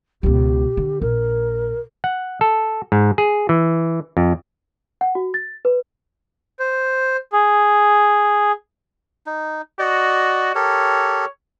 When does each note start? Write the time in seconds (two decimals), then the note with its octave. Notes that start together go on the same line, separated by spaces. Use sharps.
0.23 C#2 B2 G4
0.77 D3
1.01 A#1 A#4
2.04 F#5
2.41 A4
2.92 G#2
3.18 G#4
3.49 E3
4.17 F2
5.01 F#5
5.15 F#4
5.34 A6
5.65 B4
6.60 C5
7.33 G#4
9.26 D#4
9.79 F#4 D5 D#5
10.55 G4 A4 A#4 C#5